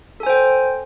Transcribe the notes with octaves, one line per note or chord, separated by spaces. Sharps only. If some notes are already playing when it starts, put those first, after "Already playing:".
A4 C5 G5 G#5